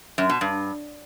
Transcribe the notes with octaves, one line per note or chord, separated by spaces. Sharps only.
F#2
B2
G2